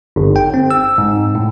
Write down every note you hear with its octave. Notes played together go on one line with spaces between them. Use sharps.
G1
G5
C4
E6
G#2
A2